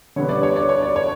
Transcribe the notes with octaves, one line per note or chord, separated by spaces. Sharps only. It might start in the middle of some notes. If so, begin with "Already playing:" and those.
D3 G3 B3 C#5
D5
C#5
D5
C#5
D5
C#5